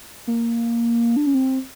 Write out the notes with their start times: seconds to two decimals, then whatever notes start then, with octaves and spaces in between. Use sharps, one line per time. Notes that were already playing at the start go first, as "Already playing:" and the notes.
0.27 A#3
1.16 D4
1.26 C#4
1.34 C4